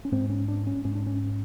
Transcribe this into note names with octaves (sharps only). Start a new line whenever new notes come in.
C#4
G#2 C4
C#4
D4
C#4
G#2 C#4
D4
C#4